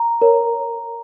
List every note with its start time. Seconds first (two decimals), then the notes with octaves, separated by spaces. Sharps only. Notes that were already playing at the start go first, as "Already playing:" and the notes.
Already playing: A#5
0.22 A#4 C#5